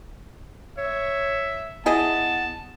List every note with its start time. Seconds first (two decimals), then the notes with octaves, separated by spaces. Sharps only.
0.78 C#5 E5
1.86 B3 E4 G#4 D#5 A5